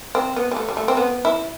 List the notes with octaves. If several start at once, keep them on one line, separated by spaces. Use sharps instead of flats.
C4
B3
G3
A3
G3
A3
C4
B3
E4